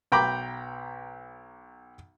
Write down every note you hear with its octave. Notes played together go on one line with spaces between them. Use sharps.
B1 G5 A#5 B5 D6